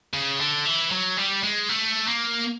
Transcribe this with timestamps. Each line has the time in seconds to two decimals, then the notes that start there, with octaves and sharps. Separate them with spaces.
0.13 C#3
0.39 D3
0.65 E3
0.91 F#3
1.17 G3
1.43 G#3
1.69 A3
2.08 A#3